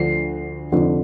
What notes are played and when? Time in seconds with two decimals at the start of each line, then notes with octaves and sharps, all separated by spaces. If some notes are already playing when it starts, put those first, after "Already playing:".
Already playing: D2 D3 F3 C7
0.72 F1 F2 D3 F3